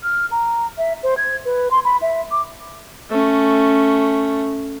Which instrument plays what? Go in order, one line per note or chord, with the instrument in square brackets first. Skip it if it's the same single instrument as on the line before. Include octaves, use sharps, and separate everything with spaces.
[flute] F6
A#5
E5
C5
G#6
B4
C6
B5
E5
D6
[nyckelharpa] A3 C#4